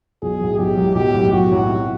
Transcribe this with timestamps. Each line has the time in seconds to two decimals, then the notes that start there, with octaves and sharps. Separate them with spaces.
0.22 B1 G#4
0.40 A2 F#3
0.58 B1 G4
0.77 A2 F#3
0.95 B1 G4
1.14 A2
1.19 F#3
1.32 B1 F#4
1.52 A2 F#3
1.70 C3